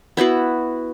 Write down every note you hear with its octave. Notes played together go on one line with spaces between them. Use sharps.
B3 E4 F#4 B4